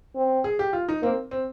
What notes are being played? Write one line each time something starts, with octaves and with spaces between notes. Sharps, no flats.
C4
G#4
G4
F4
D#4
A#3 C4
C4